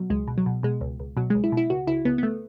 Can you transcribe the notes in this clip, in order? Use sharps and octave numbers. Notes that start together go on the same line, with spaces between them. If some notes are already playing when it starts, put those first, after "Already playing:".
Already playing: B2 F#3
C#2 G#3
B2
F#3
B2
B2 G#3
C#2
C#2
B2 F#3
C#2 G#3
E4
B2
E4
C#2 F#4
C#2 E4
C#2 B3
B3
A3